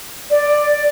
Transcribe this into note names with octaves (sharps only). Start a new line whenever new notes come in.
D5